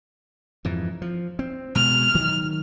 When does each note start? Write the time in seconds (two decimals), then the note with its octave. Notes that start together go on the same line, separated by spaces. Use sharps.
0.65 F2 G#2 E3
1.02 F3
1.39 C4
1.75 B2 G#3 F6
2.15 D#3 F#3